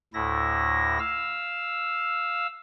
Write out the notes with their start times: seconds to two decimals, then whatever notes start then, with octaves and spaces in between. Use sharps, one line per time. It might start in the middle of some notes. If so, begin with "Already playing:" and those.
0.14 D2 A2 E4 A#6
0.99 F5 E6